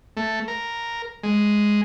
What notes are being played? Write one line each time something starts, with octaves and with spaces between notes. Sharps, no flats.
A3
A#4
G#3